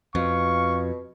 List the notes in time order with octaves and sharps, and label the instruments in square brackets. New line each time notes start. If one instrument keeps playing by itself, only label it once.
[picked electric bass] F2 [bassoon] B2 [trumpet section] F5 C#6